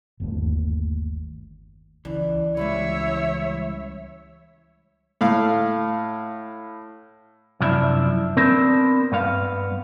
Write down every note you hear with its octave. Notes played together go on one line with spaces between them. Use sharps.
G1 D#2 A3
C#2 C#3 E3 D4
E3 G3 G#3 C#4 E4 B4 C#5 E5
A2 F5
C2 F#2 F3 D4 E4 E5
B3 C4 D4 A#4 C5
G2 B3 F5